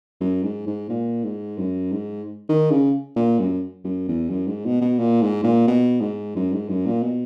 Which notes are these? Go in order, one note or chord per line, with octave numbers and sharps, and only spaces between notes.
F#2
G#2
G#2
A#2
G#2
F#2
G#2
D#3
C#3
A#2
F#2
F#2
E2
F#2
G#2
B2
B2
A#2
G#2
A#2
B2
G#2
F#2
G#2
F#2
A#2
B2